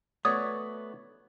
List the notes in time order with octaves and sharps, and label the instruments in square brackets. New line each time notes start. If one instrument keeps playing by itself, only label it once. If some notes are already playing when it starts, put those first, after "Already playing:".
[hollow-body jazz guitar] A3 B3 [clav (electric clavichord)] F#4 C#5 D5 [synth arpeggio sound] D#6